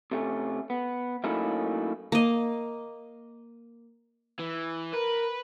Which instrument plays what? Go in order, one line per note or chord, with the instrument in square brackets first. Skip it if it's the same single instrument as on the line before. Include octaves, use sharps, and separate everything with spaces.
[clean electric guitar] C3 A3 C#4
B3
F#3 A3 A#3 C#4 D#4 E4
[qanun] A#3 D#5
[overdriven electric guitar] E3
[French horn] A#4 [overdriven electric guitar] B4